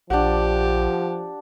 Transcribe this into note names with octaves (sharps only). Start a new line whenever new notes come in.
A#1 F3 D4 G4 F#5